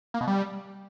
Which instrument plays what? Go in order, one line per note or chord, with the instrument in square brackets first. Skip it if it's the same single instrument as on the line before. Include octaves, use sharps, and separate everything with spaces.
[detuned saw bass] A#3
B2
G3